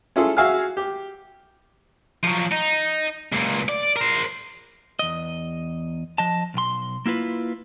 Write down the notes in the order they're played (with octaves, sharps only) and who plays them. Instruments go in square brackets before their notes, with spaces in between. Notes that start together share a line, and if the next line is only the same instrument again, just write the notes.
[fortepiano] C#4 E4 F4 G#4 A4
F#4 G#4 E5 F5 G#5 F6
G4
[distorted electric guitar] F3 F#3
D#4
C#2 A#2
D5
A#4 C5
[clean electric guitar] E2 D#5
F3 D#5 A5
B1 C6
A#3 E4 F4 B4